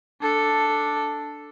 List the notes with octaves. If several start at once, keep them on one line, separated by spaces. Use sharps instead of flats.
D4 A4